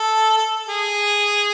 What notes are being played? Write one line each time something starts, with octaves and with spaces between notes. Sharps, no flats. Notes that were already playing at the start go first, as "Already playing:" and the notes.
Already playing: A4
A4
G#4